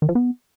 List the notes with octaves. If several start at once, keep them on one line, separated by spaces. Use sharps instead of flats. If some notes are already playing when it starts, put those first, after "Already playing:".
D#3
F3
B3